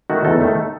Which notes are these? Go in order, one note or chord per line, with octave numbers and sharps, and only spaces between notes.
D#3 A3 F#4
E2 A4
D#3 A3